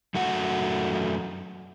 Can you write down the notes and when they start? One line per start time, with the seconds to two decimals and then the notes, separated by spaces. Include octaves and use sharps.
0.15 F#2 A3 F#4 F#5